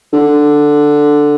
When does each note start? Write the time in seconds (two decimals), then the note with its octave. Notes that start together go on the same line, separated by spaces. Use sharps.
0.13 D3